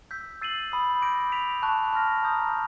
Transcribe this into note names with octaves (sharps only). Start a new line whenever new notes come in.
E6 G6 B6
E6 A6 C7 D#7 F#7
B5 D#6 G6
D6 G6 A#6 D7
G6 B6 D7 F7
A5 C#6 F#6
A5 C6 F6 A#6
A#5 D#6 G6